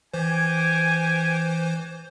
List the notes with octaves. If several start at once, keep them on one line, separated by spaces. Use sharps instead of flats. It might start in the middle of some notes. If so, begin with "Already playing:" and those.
E3 G4 C5 G#5